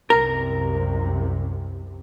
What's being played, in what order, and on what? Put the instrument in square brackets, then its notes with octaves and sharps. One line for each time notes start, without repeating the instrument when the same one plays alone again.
[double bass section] C2 F#2 C3 [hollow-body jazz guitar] A#4